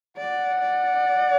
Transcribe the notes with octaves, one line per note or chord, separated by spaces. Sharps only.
D5 F#5
D5